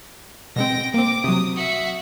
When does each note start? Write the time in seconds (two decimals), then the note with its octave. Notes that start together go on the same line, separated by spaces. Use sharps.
0.56 B2 G#3 C4 G5 A#6
0.94 A#3 C4 D6
1.24 C3 F#3 D#6
1.55 F#4 E5